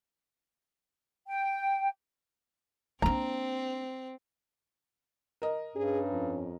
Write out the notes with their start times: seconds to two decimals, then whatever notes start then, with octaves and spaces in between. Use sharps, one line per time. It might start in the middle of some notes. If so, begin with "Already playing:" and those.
1.27 G5
3.02 A#3 C4 D4 A#5
5.42 A#4 D#5
5.76 G2 C#4 G#4
6.12 F2